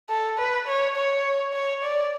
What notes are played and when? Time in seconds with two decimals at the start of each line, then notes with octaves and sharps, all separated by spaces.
0.09 A4
0.38 B4
0.67 C#5
0.96 C#5
1.53 C#5
1.83 D5